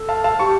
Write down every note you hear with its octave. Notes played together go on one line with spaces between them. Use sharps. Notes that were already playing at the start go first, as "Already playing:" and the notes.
Already playing: A4
F5 A5
F5 A5
G4 A5 C#6